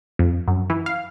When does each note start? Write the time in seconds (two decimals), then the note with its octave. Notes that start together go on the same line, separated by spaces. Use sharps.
0.19 F2
0.48 F#2
0.70 E3
0.86 F5